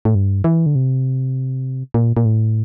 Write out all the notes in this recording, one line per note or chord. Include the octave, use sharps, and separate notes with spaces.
A2
G2
E3
D3
C3
A#2
A#2
A2